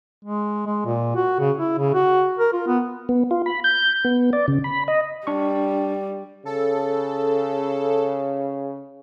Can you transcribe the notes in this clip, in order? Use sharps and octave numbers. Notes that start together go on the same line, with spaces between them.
G#3
G#3
A#2
F#4
C#3
E4
C#3
F#4
A#4
F4
B3
B3
F4
B5
G6
B3
D5
C#3
B5
D#5
G3 D4 C#6
C#3 A4